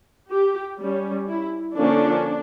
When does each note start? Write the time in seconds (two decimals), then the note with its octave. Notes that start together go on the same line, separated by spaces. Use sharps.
0.31 G4
0.80 G3 C#4
1.28 E4
1.76 D3 F3 A#3 C#4 D4